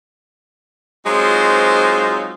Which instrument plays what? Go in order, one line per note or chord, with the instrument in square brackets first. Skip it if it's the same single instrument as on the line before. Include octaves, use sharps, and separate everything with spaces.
[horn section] F#3 G#3 C4 D#4 F4 C5